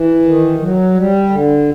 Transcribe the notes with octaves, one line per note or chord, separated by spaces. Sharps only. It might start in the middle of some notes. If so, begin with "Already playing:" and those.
Already playing: E3
D#3
F#3
G3
D3